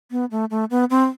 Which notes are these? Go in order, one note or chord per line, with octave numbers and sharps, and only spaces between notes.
B3
A3
A3
B3
C4